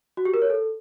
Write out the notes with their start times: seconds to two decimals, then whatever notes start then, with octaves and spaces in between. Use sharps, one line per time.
0.17 F#4
0.25 G4
0.34 A#4
0.42 C#5
0.50 A4